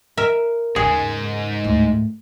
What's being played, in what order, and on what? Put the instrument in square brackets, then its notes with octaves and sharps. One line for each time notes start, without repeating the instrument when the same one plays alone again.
[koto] A#4 E5
[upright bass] D#2 C#3 [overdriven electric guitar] G#2 G#3 [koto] G#4
[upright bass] D2 A2